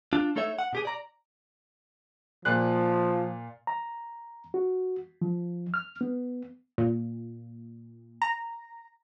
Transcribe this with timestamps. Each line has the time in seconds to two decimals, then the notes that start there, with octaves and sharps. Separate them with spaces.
0.13 D4 F4
0.36 A3 D#4 A4 C#5 E5
0.59 F#5
0.73 B2 G4 G#4
0.85 D5 A#5
2.45 A#2 F3 D5 F#6
3.67 A#5
4.54 F#4
5.22 F3
5.74 F6
6.01 B3
6.78 A#2
8.22 A#5